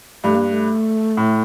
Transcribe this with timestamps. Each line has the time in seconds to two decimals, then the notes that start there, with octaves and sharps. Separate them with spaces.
0.24 G2 A3
0.36 A#3
0.49 A#3
0.53 A3
1.17 A2